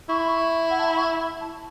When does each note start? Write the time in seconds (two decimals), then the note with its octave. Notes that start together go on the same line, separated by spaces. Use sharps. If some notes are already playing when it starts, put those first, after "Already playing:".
0.08 E4 C#6
0.18 B5
0.27 C#6
0.70 F#5
0.79 A5
0.87 B5
0.97 C#6
1.18 B5
1.40 A5